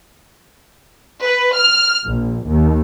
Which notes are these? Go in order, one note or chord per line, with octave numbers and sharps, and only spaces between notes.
B4
F6
A#1
D#2